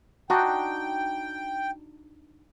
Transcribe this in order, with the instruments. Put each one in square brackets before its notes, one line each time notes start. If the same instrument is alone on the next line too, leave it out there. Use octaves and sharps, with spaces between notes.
[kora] D4 D#4 F#4 [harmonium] G5